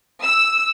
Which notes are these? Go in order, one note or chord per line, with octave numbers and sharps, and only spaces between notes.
E6